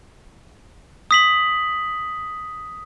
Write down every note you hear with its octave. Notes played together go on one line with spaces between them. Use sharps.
D#6 B6 F#7